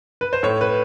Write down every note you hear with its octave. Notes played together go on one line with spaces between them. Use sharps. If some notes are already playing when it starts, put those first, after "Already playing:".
B4
C5
A2 C#5
B4